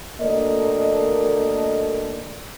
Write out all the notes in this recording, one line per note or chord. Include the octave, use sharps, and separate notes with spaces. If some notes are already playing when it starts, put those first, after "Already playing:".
D2 A#3 A4 A#4 D5 D#5